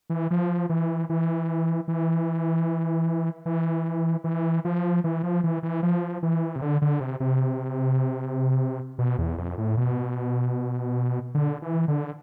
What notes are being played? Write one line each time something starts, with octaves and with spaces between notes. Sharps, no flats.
E3
F3
E3
E3
E3
E3
E3
F3
E3
F3
E3
E3
F3
E3
C3
D3
D3
C3
C3
B2
E2
F2
A2
B2
D3
E3
D3